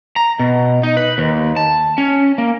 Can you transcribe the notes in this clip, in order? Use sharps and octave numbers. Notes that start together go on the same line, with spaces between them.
A#5
B2
D#4
B4
D#2
A5
C#4
A#3